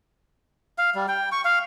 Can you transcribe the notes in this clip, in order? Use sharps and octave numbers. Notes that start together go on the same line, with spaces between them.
F5
G3
G5
C#6
F5